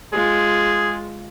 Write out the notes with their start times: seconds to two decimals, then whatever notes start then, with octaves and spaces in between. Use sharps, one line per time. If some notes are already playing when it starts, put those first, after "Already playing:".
0.13 G#3 F4 G#4